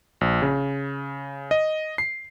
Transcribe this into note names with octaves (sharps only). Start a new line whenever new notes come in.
A#1
C#3
D#5
C7